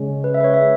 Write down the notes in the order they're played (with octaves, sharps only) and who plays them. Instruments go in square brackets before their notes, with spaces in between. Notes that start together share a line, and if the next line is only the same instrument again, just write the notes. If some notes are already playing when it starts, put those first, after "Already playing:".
Already playing: [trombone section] C#3 G#3 C#4
[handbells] B4
E5
B4
C#5
E5